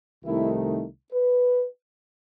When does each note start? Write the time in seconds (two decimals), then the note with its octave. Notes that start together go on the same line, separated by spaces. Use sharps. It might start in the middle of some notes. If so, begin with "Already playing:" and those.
0.23 C2 C3 D#3 A3 D#4 E4
1.12 B4